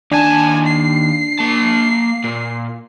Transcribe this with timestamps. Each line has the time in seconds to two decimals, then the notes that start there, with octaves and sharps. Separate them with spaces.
0.12 D#2 D4 G#5 A5
0.67 C7
1.39 A#3 A5
2.24 A#2